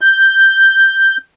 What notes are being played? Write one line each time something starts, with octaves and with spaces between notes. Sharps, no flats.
G6